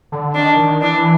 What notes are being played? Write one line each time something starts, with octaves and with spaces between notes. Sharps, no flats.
D3
D#3 D4
D#3
E3 D4